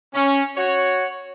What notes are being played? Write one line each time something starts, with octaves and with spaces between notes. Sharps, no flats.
C#4
F#4 C#5